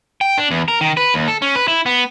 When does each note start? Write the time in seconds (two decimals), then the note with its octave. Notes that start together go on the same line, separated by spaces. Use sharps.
0.21 G5
0.38 D4
0.51 E2
0.68 A#4
0.81 D#3
0.97 B4
1.14 D#2
1.28 A4
1.42 C#4
1.56 B4
1.68 E4
1.86 B3